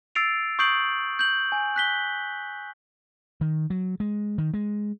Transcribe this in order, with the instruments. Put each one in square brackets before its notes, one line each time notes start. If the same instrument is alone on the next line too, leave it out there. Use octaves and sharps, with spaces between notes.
[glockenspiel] E6 A6 C7 D7 F7
C#6 D#6 G6 C7 D7 F#7
G6 F#7
G#5
F#6 B6 G7
[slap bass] D#3
F#3
G#3
D#3
G#3